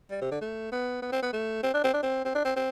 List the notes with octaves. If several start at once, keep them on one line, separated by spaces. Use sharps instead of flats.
G3
C3
D3
A3
B3
B3
C4
B3
A3
C4
D4
C4
D4
C4
C4
D4
C4
C4